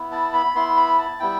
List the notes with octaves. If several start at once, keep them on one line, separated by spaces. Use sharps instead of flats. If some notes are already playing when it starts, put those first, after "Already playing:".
Already playing: B3 E4
A5
B5
B3 E4 C6
B5
A5
G3 B3 E4 G5